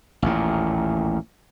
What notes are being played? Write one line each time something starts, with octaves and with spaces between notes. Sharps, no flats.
A1 D#2 A#2